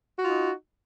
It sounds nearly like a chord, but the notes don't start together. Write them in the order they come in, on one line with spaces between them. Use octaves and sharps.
F#4 F4 D#4